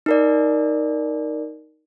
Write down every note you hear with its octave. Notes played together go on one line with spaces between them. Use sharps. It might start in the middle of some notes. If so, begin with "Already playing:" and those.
D#4 A#4 D5